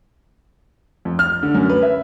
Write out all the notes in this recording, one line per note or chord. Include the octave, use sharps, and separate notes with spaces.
F2
F6
D3
F#2
B4
E5